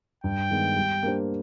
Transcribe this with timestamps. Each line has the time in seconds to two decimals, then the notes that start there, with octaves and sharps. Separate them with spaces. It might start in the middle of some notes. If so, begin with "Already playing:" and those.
0.24 G2 G5
0.50 D#3 G#3 B3
0.76 G3
1.03 A#3 D4 G4 C5